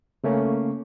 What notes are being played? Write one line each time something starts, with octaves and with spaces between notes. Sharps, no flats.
C#3 A3 A#3 C#4